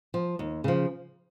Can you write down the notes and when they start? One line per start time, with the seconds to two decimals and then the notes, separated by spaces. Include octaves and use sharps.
0.14 F3
0.39 D#2
0.64 C#3 F3